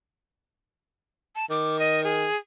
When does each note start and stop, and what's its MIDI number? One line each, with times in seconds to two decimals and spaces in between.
1.35 1.45 81
1.50 2.26 51
1.50 1.79 86
1.79 2.04 75
2.04 2.37 68